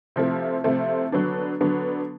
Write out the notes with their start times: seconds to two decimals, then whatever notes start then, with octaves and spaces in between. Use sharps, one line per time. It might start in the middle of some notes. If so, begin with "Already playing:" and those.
0.16 C3 F3 A3 C4 E4
0.64 C3 F3 A3 C4 E4
1.12 D3 F#3 B3 D4
1.61 D3 F#3 B3 D4